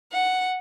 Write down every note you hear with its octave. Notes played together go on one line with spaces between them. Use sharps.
F#5